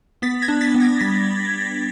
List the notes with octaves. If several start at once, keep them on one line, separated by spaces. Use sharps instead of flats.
B3 A6 B6
G#6 A#6
D4
A6 B6
B3
G#6 A#6
G3 A6 B6